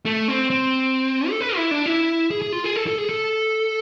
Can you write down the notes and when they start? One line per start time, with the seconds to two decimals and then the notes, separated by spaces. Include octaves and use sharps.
0.05 A3
0.28 C4
0.50 C4
1.30 A4
1.41 B4
1.56 E4
1.71 D4
1.86 E4
2.31 G#4
2.42 G#4
2.53 F4
2.64 G#4
2.76 A4
2.87 A4
2.98 G#4
3.09 A4